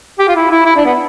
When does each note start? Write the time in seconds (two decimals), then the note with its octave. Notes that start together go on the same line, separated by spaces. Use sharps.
0.19 G4
0.28 F4
0.36 E4
0.51 E4
0.65 E4
0.76 D4
0.85 B3